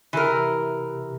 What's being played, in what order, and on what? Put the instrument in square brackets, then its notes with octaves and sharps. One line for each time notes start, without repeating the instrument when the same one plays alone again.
[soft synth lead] C3 [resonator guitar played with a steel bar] E3 A#4